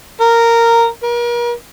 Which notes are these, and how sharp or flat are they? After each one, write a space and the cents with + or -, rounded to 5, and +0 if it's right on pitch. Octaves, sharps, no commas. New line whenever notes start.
A#4 -10
A#4 +40